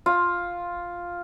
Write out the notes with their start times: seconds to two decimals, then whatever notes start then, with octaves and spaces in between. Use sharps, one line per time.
0.06 F4